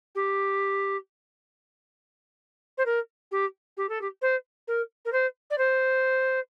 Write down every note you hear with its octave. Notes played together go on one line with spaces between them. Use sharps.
G4
C5
A#4
G4
G4
A4
G4
C5
A#4
A#4
C5
D5
C5